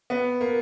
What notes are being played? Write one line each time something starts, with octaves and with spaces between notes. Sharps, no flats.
B3
A#3